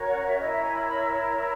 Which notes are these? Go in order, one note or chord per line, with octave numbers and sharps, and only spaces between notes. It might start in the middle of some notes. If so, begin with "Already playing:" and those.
Already playing: C#4 F#4 A#4 C#5
F#5
E5
E4 A#4 C#5 D#5
E5
G#5
B5
B5